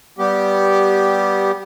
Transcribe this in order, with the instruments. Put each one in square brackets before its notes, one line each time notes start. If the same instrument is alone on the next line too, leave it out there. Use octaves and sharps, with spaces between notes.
[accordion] G3 B3 G4